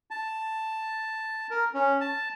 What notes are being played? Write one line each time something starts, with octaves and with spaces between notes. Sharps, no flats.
A5
A#4
C#4
A5